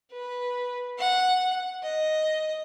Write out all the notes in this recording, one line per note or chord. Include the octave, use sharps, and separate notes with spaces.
B4
F#5
D#5